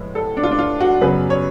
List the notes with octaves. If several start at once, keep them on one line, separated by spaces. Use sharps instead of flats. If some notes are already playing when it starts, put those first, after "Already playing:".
Already playing: A2 F3 G#3 B3
A4
D4
F4
D4
F4
F#4
F#2 C#3 F#3 B3 B4
C#5